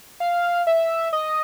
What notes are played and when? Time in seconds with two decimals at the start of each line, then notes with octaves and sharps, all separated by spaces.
0.20 F5
0.67 E5
1.13 D#5